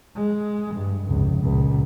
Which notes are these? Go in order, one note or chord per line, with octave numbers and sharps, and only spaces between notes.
G#3
G2
F1 C#2
C#2 A#2